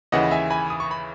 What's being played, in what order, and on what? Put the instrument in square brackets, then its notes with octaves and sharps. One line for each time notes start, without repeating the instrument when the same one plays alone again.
[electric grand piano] D#2 C#3 E3 D#5 F#5
E5 G#5
G#5 B5
D#6
C#6
B5